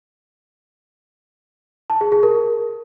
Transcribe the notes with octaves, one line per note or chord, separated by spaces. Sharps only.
A5
G#4
G#4
A#4